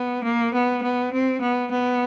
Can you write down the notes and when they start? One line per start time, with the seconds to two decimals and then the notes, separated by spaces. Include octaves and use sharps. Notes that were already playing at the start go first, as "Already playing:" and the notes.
Already playing: B3
0.24 A#3
0.54 B3
0.84 B3
1.13 C4
1.42 B3
1.71 B3